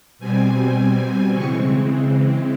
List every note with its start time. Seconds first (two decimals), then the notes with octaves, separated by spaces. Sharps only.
0.19 B2 G3 C4 G#5
1.33 C#3 E3 G#3 C4 C#6